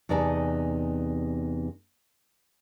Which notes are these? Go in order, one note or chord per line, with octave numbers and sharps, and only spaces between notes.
E2 C3 D#4 D5 G#5 A5